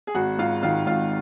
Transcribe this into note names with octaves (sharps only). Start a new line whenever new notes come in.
G#4
G#1 F#4
G#2 F4
D#3 F4
G#1 F4